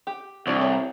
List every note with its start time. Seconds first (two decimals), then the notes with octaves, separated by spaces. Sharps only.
0.07 G4
0.47 C2 D4 F#4 D5
0.61 A3 C#5